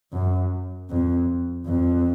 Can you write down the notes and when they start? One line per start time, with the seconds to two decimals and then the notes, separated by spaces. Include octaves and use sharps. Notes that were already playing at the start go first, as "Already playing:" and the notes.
0.13 F#2
0.90 F2
1.67 F2